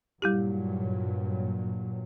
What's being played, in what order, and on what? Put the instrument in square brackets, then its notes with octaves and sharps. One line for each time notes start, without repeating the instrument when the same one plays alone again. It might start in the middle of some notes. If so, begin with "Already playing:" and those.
[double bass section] G2 A#2 F#3 [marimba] G3 E4 G4